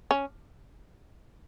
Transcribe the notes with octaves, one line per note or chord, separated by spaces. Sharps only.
C#4